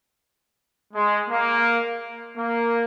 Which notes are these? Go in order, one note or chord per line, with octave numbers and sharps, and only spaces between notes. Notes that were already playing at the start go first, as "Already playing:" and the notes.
G#3
A#3
A#3